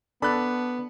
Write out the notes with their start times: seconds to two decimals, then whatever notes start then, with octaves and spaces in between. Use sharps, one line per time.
0.22 B3 D4 A4 A5 B5 F#6